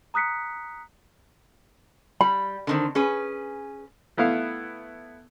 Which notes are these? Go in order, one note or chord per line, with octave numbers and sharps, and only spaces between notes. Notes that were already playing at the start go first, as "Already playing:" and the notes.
A#5 D#6 F#6 B6 C#7
G3 B5
D3 D#3 C4
C#4 G#4 B4
A3 B3 E4 F5